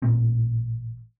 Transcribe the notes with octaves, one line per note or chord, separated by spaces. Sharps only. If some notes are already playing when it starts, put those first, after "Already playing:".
A1 A#2 A3 C4